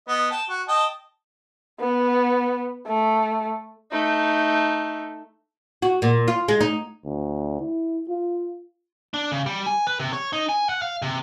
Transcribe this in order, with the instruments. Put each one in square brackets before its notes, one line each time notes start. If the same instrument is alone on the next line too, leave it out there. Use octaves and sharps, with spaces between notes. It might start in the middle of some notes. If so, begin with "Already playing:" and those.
[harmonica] B3 D#5
G5 A5
F#4
D#5 G5 A5
[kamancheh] B3
A3
[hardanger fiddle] A3 D#4
[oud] F#4
A#2
F4
G#3
D#4
[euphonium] D2
E4
F4
[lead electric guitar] D4
C#3
G3
G#5
B4
C3
C#5
D#4
G#5
F#5
F5
C3